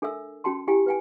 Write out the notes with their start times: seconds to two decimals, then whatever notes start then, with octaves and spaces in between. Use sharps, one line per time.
0.02 D4 A4 A#4 E5 E6
0.44 C#4 F#4 G5 A5 C6
0.67 E4 G4 G5 G#5
0.86 B4 G5 G#5